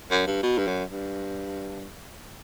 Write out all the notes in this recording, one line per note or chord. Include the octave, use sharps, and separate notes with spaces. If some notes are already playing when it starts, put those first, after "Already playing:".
F#2
G2
B2
G2
F#2
G2